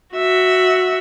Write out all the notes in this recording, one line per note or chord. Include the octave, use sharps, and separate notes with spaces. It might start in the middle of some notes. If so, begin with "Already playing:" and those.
F#4 E5